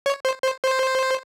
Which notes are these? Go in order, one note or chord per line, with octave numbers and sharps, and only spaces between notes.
C#5
C5
C5
C5